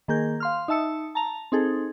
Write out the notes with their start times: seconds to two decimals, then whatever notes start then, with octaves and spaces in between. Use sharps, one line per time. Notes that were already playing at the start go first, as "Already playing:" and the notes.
0.08 D#3 A#3 G#4 A#4 G6
0.40 F5 C6 F6
0.68 D#4 E5 A5 E6 C#7
1.15 A5 A#5 F7
1.52 C4 D#4 G#4 A4